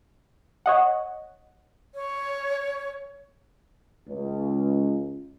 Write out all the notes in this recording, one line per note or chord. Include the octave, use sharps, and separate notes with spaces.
C#5 D#5 F#5
C#5
C#2